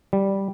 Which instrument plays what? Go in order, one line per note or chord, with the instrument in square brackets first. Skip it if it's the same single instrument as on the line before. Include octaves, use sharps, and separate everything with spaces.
[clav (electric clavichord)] G3